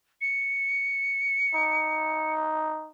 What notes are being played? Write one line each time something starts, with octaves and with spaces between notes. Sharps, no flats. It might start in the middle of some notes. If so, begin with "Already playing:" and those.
C#7
D#4